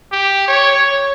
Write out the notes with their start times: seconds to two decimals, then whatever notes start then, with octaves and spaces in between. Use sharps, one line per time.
0.12 G4
0.48 C#5